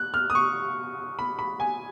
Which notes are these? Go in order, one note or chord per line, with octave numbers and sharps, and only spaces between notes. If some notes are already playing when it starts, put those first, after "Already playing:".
Already playing: F#6
F6
D#6
C#6
B5
B5
G#5